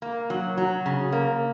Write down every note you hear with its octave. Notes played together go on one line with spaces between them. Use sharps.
A#3
F#3
F#3
C#3
A#3